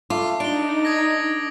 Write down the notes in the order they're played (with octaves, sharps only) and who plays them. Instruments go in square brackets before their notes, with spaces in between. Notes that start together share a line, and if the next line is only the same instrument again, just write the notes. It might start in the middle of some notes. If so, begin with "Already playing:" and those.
[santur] A3 D#5 B5 [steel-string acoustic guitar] F4 [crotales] D6
[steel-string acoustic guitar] D4 [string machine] D#4 [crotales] D7 G7
[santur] D#5 A#5 [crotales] D#6 G#6 A#6